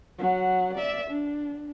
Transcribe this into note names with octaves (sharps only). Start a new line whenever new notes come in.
F#3 F#5
D5 E5
D4